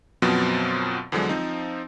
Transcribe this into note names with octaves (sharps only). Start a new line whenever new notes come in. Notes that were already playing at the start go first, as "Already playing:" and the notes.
F#2 B2 F3 F#3 B3 C4
E2 D3 F3 F#3 G#3
F3 C4 D#4